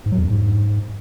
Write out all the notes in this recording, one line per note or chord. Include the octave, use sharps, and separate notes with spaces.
G#2
F#3
E2
F#2
G#2